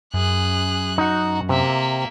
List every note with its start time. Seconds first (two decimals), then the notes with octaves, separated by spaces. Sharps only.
0.14 F#2 G#4 F#6
0.98 D#4 F#4 F#5
1.49 C3 A#3 E5